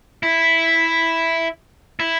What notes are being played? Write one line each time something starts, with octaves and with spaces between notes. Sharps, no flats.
E4
E4